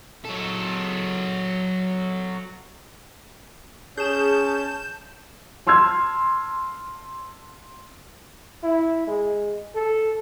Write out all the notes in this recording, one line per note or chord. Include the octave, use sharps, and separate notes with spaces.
F#3 A4
C#4 G#4 A5 G6 E7
A5 C6 E6 F6 G#6
E4
G#3
A4